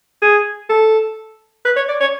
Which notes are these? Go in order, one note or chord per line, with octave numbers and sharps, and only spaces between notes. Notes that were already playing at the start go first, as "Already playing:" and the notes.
G#4
A4
B4
C#5
D5
C#5